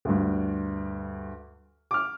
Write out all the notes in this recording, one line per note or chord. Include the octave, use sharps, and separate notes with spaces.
D2 G2
D6 F6